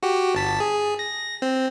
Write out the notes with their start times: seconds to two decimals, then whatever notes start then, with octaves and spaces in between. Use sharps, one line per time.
0.03 F#4 G4
0.35 G1 A5 B6
0.60 G#4
0.99 A#6
1.42 C4